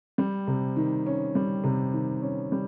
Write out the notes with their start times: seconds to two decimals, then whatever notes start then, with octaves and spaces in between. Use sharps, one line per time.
0.18 G3
0.47 C3
0.76 D#3
1.06 C#4
1.35 G3
1.64 C3
1.94 D#3
2.22 C#4
2.52 G3